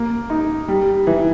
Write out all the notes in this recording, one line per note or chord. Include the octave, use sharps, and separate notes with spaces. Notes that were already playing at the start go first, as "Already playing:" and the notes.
Already playing: A#3
D#4
G3
E3